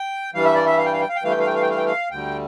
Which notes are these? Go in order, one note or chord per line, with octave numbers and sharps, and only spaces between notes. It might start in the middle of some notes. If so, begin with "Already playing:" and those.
Already playing: G5
G2 E3 G3 F5
E5
D5
E5
F5
G5
F5
G5
F5
G5
G2 E3 A3 F5
G5
F5
G5
F5
G5
F5
G5
F5
D2 D3 G3 G5